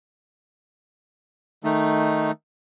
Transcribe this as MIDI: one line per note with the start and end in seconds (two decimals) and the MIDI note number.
1.64 2.31 51
1.64 2.31 57
1.64 2.31 63